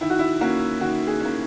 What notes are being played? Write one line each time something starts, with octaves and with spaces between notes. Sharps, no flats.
D#3 E4
F#4
E4
A#3 C#4 F#4
D#3 F#4
G#4
A#3 C#4